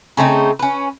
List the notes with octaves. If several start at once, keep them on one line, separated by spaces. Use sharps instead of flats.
C#3 A3 C4 D#4
C#4 B4